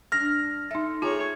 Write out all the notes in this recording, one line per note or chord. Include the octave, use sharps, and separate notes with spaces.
G2 D4 F6 A#6
D#4 A4 E5
A3 F4 G#4 C#5 G#5 A#5